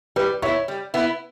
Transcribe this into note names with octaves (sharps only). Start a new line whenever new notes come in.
G3 B4
B3 E4 C#5
G3
B3 E4